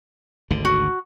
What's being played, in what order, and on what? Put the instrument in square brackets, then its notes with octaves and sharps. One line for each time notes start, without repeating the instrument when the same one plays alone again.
[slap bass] G#1 D2 D3
[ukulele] F#4